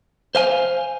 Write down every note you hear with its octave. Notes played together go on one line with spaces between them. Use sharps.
C5 F5 G#5